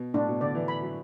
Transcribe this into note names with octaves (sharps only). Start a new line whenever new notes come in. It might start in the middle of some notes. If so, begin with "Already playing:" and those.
Already playing: B2
A2 D4
B2
D3 D5
E3
B5
F#3